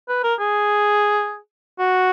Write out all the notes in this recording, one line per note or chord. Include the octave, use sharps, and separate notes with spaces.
B4
A#4
G#4
F#4